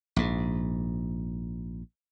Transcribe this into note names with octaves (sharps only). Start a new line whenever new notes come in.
A#1 G#2